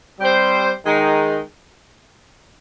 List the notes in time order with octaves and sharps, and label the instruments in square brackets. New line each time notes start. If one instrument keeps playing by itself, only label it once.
[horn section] G3 C4 G4 C5
D#3 G#3 D#4